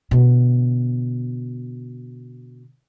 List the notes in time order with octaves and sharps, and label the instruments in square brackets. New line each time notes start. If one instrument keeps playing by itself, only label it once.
[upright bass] B2 D3